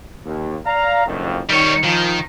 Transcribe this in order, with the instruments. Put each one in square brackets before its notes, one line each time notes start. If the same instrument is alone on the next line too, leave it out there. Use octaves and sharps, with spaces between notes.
[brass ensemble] D#2
D5 F5 A#5
F#1 F2 D#3
[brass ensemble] D#3 [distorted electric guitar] G3 C#5
[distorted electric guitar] D#3 [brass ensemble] F3